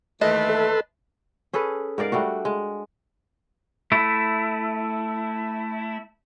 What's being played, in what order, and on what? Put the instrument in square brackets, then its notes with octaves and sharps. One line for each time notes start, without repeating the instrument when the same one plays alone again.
[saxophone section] D#2 E3 A3 [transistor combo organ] B4 A5 C6 [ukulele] D#5
[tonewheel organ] A4
[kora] C#4 G#4 A4 B4
G#2 A#4 D5 F5
G3 A3 D4 F#4
G#3
[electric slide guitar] A3 E4